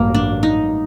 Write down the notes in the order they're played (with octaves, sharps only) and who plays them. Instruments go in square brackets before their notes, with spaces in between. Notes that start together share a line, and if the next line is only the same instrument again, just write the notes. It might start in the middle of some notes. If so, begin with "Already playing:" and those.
Already playing: [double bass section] A1 G2 F#3 [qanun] A#3
[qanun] D4
D#4